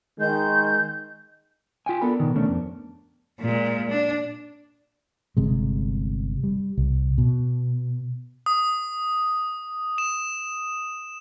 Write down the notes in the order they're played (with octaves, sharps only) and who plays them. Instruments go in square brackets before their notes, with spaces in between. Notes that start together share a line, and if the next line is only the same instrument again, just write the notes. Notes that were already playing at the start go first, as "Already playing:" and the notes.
[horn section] D#3 G#3 [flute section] G6
[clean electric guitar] F4 G5 G#5
[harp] B3 D4 A#4 [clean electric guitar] A4 B5
[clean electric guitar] B2 D#3
[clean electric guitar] D2 A3 C#4 [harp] D4
[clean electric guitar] F2
[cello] A#2 G#3
D4
[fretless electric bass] G1 C3 G#3
G3
C2
B2
[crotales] D#6
E7